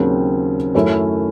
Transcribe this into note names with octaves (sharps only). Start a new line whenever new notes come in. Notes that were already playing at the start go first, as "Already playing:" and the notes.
Already playing: D#2 C#3 F#3 C4
F#2 D#3 A3 C#4 E4